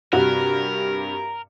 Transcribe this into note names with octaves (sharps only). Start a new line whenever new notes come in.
G2 C3 F#4 A#4